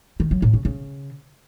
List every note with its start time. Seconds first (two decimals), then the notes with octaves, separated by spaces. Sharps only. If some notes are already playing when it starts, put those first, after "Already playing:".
0.20 D#3
0.31 F#3
0.42 A2
0.54 C#3
0.65 C#3